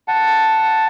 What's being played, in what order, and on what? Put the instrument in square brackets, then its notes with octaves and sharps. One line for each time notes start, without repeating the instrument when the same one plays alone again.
[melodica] F#5 A5